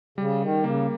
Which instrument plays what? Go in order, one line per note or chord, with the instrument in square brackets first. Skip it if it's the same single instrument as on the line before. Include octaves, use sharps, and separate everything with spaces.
[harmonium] C#3 [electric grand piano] G3
[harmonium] D#3
[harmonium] C#3 [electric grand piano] A#3